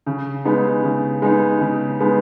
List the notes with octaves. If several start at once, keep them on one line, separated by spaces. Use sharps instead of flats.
C#3
G#3 B3 D#4
C#3
G#3 B3 D#4
C#3
G#3 B3 D#4